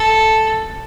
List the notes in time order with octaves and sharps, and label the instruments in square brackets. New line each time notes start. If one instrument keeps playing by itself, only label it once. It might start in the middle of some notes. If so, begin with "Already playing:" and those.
Already playing: [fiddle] A4